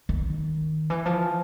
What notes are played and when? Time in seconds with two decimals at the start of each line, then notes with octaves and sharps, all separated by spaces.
0.09 D#3
0.90 E3
1.06 F3